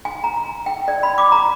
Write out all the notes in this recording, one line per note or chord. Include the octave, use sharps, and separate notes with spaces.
G#5
A#5
G5
D5
B5
D6
A#5